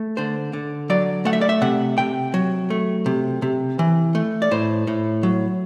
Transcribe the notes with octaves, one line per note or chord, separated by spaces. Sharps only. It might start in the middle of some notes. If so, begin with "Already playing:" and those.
Already playing: A3
D3 C5
D3
F#3 D5
A3 F#5
E5
D5
E5
C3 F#5
C3 G5
F#3
A3
C3
C3
E3
A3
D5
A2 C5
A2
F#3